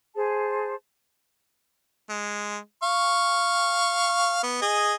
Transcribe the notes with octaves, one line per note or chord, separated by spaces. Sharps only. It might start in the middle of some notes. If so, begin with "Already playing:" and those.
G#4 C5 A5
G#3
F5 C#6
B3
G#4 D#5